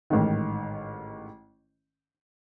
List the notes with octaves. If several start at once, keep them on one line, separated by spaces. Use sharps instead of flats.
A1 G#2 D#3